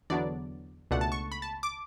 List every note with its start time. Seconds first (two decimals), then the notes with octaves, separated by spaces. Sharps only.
0.10 E2 D3 F#3 B3 D4 D5
0.91 C#2 B2 A3 D4 F#5
1.01 A5
1.12 C#6
1.32 B5
1.42 A5
1.63 D6